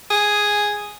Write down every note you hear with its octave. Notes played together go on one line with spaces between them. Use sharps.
G#4